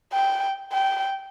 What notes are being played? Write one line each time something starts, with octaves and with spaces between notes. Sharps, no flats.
G5
G5